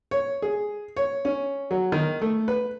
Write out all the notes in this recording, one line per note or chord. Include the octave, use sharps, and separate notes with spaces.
C#5
G#4
C#5
C#4
F#3
D#3
A3
B4